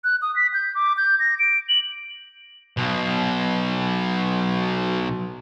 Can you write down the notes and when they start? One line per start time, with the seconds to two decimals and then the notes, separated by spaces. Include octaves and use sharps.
0.04 F#6
0.22 D#6
0.36 B6
0.54 G6
0.75 D6
0.97 G6
1.19 A#6
1.39 D7
1.69 F#7
2.77 B1 B2